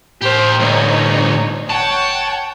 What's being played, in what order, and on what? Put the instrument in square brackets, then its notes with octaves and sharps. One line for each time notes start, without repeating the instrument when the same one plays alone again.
[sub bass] A2 [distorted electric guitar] G4 A#4 [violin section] C5
[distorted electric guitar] D2 G2 [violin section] D#4 C#5
[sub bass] F1 [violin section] C#5 F#5 G5 [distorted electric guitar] A5